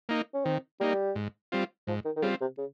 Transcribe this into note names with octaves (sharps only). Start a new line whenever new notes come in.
A#3 D#4
C#4
D#3 C4
G3 A#3 D#4
G#2
G3 C4 F4
G#2 F3
D#3
D#3
C#3 G3 C4 F4
C3
C#3